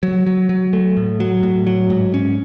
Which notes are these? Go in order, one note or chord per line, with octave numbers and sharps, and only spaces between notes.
F#3
F#3
F#3
A3
A2
F#3
A2
F#3
G#2
C#4